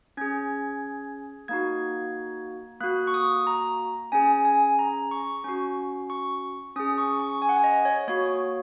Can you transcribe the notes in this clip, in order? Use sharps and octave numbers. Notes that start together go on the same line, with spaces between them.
C#4 G#4 G#6
A#3 D#4 F#4 G#6
A#3 F#4 F#6
C#6
D#6
A#5
C#4 G#4 G#5
G#5
A#5
C#6
C#4 F#4
C#6
C#4 G#4 D#6
C#6
C#6
G#5
F#5
G#5
D#5
C#5
A#3 F#4 C#5